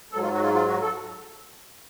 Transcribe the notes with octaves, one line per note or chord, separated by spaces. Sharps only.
G#2 F#3 A4
F4
F#4
F4
F4
F#4
A4